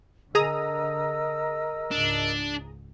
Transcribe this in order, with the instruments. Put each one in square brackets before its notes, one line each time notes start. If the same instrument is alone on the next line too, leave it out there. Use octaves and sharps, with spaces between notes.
[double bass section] D3 [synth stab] G#4 A#5 D#6 [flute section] A#4 D#5 E6
[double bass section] C#2 G#2 [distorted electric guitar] D4